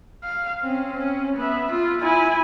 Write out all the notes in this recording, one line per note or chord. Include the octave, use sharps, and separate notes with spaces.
F5
C4 C#4
C#4
B3 E5
F4
E4 G#5